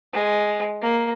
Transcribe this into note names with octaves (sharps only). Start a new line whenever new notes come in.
G#3
A#3